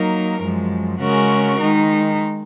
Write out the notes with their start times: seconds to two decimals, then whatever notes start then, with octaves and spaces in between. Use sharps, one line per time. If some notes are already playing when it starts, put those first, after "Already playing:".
Already playing: F#3 A#3 D#4 A#4
0.41 F#2 F3 G#3
1.00 C#3 G#3 C#4 F#4 A#4
1.59 D#3 G#3 D#4